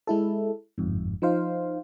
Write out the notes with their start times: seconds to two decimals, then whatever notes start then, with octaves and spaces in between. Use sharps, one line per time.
0.07 G#3 E4 A4
0.78 G1 F2 G#2
1.22 F3 D#4 C5 F5